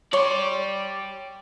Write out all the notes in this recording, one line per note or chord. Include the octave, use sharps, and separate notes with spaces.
G4 C#5 D5 C6